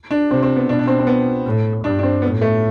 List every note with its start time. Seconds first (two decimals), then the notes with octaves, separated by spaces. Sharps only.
0.11 D4
0.31 C3 C4
0.43 C4
0.56 B3
0.68 B2 D4
0.79 D4
0.87 C4
0.99 C4
1.07 B3
1.46 A2
1.84 G2 D4
1.99 D4
2.03 C4
2.22 A2 B3
2.41 A3